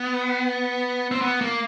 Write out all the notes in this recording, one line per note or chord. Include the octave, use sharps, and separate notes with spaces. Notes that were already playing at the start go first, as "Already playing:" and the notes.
Already playing: B3
C4
B3
A#3